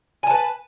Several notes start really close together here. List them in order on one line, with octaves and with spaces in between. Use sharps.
G#5 A5 B4